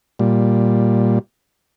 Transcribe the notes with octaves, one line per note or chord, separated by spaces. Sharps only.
A#2 G3